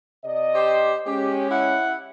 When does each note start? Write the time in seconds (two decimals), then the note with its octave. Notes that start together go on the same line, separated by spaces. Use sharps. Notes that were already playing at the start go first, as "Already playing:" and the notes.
0.24 C3 D5 D#5
0.54 G4 C5
1.06 G#3 C#4 G4
1.51 E4 F#5